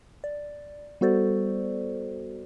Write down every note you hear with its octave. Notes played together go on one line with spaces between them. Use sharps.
D5
G3 B3 F#4 A4 C5 D5